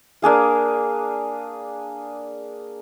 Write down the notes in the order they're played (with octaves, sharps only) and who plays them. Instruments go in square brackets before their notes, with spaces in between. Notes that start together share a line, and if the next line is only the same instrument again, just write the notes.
[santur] A#3 D4 G#4 F5